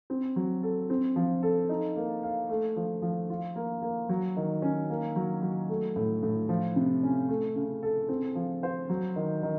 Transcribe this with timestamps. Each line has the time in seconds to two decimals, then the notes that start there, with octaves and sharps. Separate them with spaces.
0.10 C4
0.36 F#3
0.63 A4
0.90 C4
1.16 F3
1.43 A4
1.69 D#4
1.96 A#3
2.23 F5
2.49 A3
2.76 F3
3.02 F3
3.30 F4
3.56 A#3
3.82 A#3
4.09 F#3
4.37 D#3
4.62 C#4
4.90 A#3
5.16 F#3
5.43 F#3
5.69 A3
5.96 A2
6.23 A2
6.49 F3
6.76 C3
7.03 C#4
7.29 A3
7.55 C#3
7.83 A4
8.09 C4
8.35 F3
8.63 C5
8.89 F#3
9.16 D#3
9.43 D#3